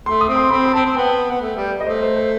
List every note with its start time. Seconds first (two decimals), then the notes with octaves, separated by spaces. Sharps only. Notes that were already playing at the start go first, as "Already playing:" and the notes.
0.06 A3 C6
0.21 D#6
0.28 C4
0.36 C6
0.51 C4 B5
0.66 B5
0.73 C4 A5
0.86 C4
0.96 B3 G5
1.31 B3
1.41 A3
1.56 G3
1.80 D#5
1.86 A3 C5
2.03 C5
2.16 C5